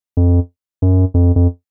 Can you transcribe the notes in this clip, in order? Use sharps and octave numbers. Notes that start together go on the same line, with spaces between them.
F2
F#2
F2
F2